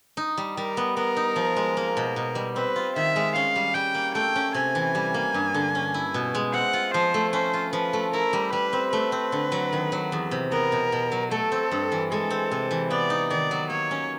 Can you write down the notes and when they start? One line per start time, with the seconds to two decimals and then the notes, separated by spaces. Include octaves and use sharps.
0.17 D#4
0.37 G3
0.57 G3 A#4
0.77 B3
0.96 B3 A#4
1.17 D#4
1.36 F3
1.56 G#3
1.77 A#3
1.97 B2
2.16 B2
2.35 G3
2.56 C4 B4
2.76 F4
2.96 D#3 E5
3.16 G#3
3.35 C#4 F5
3.56 G3
3.75 G3 G5
3.95 A#3
4.14 A3 G5
4.36 C#4
4.54 C3 G#5
4.75 E3
4.95 G3
5.14 A#3
5.34 G2
5.54 D3
5.75 C#4
5.94 E4
6.14 B2
6.35 G#3
6.53 C4 F#5
6.73 F4
6.94 F3 C5
7.14 A3
7.33 C#4 C5
7.53 F4
7.73 F3 B4
7.93 A3
8.13 E4 A#4
8.33 G3
8.52 G3 B4
8.73 C4
8.92 A3 B4
9.12 C4
9.32 D3
9.52 F#3
9.73 D#3
9.92 F#3
10.12 E2
10.31 C3
10.52 B3 A#4
10.72 B2
10.92 B2
11.12 F#3
11.31 A3 A4
11.52 C4
11.71 G2
11.92 E3
12.11 G#3 A4
12.30 C4
12.51 C3
12.71 E3
12.90 B3 D5
13.10 D#4
13.30 D#3 D5
13.51 F#3
13.70 A#3 C#5
13.91 C#4